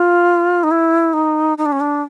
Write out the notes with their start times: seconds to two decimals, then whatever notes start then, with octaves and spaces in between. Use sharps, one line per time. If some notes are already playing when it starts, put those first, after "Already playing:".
Already playing: F4
0.63 D#4
0.71 E4
1.13 D#4
1.58 D#4
1.66 D4
1.72 C#4
1.80 D4